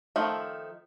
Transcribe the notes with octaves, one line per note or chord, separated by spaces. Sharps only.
D#3 F3 A3